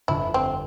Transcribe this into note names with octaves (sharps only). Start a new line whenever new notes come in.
G1 F2 D3 E4
C4